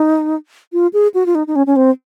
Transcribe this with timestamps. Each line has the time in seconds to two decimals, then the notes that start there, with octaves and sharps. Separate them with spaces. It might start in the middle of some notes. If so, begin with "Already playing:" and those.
Already playing: D#4
0.73 F4
0.93 G#4
1.14 F#4
1.26 F4
1.35 D#4
1.47 D#4
1.56 C#4
1.67 C#4
1.76 C4